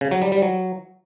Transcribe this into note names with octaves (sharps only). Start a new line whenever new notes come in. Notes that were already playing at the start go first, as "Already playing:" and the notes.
C#3
F#3
G3
G3
F#3